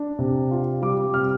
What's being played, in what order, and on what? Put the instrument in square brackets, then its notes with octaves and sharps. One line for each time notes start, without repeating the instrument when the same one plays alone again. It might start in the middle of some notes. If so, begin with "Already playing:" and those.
Already playing: [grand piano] D4
C3
F4
G3 D6
C3 F6